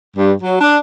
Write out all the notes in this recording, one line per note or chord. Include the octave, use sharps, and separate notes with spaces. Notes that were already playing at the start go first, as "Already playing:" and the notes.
G2
F#3
D4